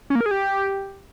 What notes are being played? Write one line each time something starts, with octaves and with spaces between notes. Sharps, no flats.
C#4
A#3
A#4
G#4
G4